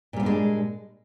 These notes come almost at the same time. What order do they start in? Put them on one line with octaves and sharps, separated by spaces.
A#2 G3 B3 D4 G#3